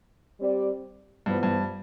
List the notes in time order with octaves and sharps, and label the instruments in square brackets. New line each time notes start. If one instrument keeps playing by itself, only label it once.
[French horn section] G3 C4 G4 D5
[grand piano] G2 [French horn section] E3 B3 F4 C5
[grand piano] G2